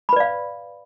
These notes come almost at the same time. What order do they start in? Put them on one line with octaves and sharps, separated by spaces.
B5 B4 D5 F5